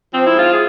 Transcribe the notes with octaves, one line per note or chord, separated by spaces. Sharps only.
F3 C4
G#2 E4
F4
G#4